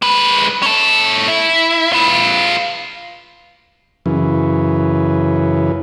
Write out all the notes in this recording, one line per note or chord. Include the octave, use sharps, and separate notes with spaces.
G#3 B4
C#4 A4
E4
F4 B4
F#2 C#3 E3